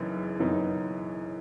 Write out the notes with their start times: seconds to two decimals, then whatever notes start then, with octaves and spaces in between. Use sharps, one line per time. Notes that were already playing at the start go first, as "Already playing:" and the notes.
Already playing: F#1 F#2 E3 B3 D#4
0.39 F#1 F#2 E3 B3 D#4